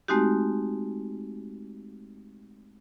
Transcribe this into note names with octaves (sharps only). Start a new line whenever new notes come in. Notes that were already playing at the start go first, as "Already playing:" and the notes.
G#3 A3 C4 D#4 F#4 G4